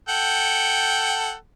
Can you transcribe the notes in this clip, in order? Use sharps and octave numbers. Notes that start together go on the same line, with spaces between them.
A4 F#5 G5